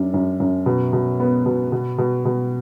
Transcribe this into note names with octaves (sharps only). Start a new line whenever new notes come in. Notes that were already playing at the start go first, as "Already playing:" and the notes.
Already playing: F#2 D4
F#2
F#2
B2
B2
B3
B2
B2
B2
B2